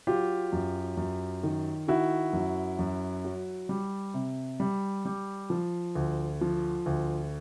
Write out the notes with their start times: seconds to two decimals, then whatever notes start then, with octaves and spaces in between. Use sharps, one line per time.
0.07 F#3 F4 G4
0.53 F#2
0.97 F#2
1.43 D#3
1.88 D#3 E4 F#4
2.33 F#2
2.79 F#2
3.25 F#3
3.69 G3
4.14 C3
4.60 G3
5.05 G3
5.50 F3
5.95 D2
6.41 F3
6.86 D2